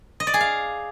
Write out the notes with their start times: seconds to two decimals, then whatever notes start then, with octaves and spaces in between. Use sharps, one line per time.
0.20 D#5
0.27 D5
0.34 G#4
0.41 F5